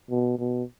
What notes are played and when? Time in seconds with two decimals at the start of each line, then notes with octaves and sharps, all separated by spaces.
0.11 B2
0.39 B2